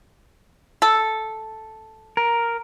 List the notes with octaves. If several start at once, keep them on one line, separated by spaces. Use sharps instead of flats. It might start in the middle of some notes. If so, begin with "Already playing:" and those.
A4
A#4